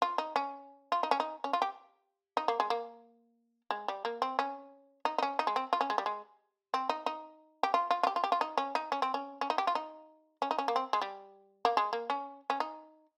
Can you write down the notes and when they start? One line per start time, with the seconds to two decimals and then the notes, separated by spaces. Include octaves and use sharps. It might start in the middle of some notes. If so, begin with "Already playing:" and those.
0.02 F4
0.18 D#4
0.36 C#4
0.92 F4
1.03 D#4
1.11 C#4
1.20 D#4
1.44 C#4
1.53 F4
1.62 G4
2.37 D#4
2.48 A#3
2.60 G#3
2.70 A#3
3.71 G#3
3.88 G3
4.05 A#3
4.22 C4
4.39 C#4
5.05 D#4
5.18 D#4
5.23 C#4
5.39 D#4
5.47 G#3
5.56 C4
5.73 F4
5.81 C#4
5.90 G#3
5.98 G3
6.06 G#3
6.74 C4
6.89 D#4
7.06 D#4
7.63 G4
7.74 F4
7.91 F4
8.03 F4
8.07 G4
8.16 F4
8.24 G4
8.32 F4
8.41 D#4
8.58 C#4
8.75 D#4
8.92 C#4
9.02 C4
9.14 C#4
9.41 C#4
9.50 D#4
9.58 G4
9.67 F4
9.75 D#4
10.42 C#4
10.51 D#4
10.58 C#4
10.68 A#3
10.76 C4
10.93 G#3
11.01 G3
11.65 A#3
11.77 G#3
11.93 A#3
12.10 C#4
12.50 C#4
12.60 D#4